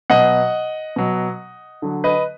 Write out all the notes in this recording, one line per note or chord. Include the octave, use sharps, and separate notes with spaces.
B2 F#3 D#5 F#5
B2 F#3
D3 F#3
B4 D#5